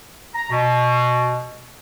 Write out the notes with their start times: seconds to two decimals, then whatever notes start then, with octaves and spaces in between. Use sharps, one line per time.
0.35 A#5
0.50 B2